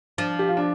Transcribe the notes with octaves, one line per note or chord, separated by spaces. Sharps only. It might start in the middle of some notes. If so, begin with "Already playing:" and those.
F3 D4
G4
F4
D4